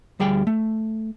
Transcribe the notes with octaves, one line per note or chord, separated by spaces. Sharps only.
D2 G3 G#4 G5
A3